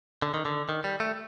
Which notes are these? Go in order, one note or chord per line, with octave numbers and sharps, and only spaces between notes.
D3
D#3
D3
D#3
G3
A3